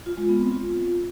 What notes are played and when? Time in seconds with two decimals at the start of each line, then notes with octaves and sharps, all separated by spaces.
0.06 F4
0.17 G#3
0.29 B3
0.40 C4
0.52 F4